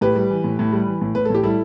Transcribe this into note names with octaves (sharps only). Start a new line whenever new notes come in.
A2 G4 B4
G3
E3
A2
A2
G3
E3
A2
A2 B4
A4
A2 G4
G3 E4 A4